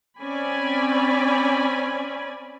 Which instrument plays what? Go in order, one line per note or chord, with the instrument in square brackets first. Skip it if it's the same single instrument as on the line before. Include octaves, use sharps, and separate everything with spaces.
[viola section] C4 C#4 D5 G#5 B5